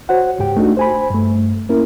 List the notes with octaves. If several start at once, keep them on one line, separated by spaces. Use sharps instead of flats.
F#4 C5 C#5 F#5
C#2 G#2 G4 G5
A3 D4 D#4 F#4
C5 G#5 B5
G2 A3
A#3 C#4 E4 A#4